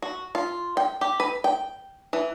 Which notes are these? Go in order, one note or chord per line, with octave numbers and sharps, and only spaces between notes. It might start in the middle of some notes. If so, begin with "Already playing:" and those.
F#4
F4
G5
G4
B4
G5
E3